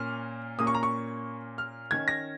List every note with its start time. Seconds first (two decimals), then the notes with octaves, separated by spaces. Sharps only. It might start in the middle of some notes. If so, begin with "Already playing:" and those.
Already playing: A#2 A#3 C#4 F6
0.59 A#2 A#3 C#4 D#6
0.67 C#6
0.75 A#5
0.83 C#6
1.58 F6
1.91 D#3 C#4 G#6
2.08 A#6